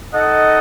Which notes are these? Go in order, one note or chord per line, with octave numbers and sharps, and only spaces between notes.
D#4 A4 D#5 F#5